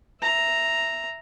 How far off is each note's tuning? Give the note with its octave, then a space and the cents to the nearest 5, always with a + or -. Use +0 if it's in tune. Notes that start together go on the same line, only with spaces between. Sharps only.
E5 +0 A#5 +0